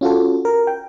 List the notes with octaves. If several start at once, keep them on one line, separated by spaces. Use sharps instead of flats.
C#4 F4 F#4 A4
A#4
G5